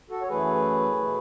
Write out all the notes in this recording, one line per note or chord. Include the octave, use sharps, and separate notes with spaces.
F#4 A4
C#5
F#2 E3 A3 G#4 B4
B2 A3